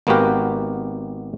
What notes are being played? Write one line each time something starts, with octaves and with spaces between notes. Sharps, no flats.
G#1 A#3 B3 F#4 G4 A#4